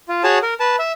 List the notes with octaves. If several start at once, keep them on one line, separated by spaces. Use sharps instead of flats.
F4
F#4 G#4 C#5 A5
A#4
B4 A5
E5